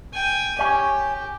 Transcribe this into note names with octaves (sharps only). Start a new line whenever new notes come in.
G5 G#5
G4 C#5 G#5